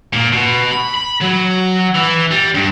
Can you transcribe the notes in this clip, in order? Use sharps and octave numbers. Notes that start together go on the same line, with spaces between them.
A#2
B2
B5
B5
F#3
E3
G3
G2